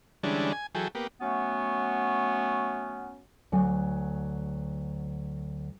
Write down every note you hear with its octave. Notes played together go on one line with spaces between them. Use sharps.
D3 E3 G3 G#3 C#4 D4
G#5
E3 F#3 G#4 A4 G5
A#3 B3 G4
F#3 A3 B3 C#4
D2 F#3 G#5